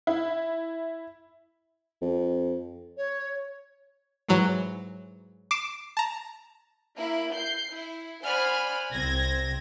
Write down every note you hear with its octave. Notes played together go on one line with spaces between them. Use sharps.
E4
F2
C#5
G#2 E3 F#3
D6 C7 D7 E7
A5 A#5
A#3 E4
G6 C7
E4
C5 D5 F#5 G#5 B5 F6
C2 C4 G#6 A#6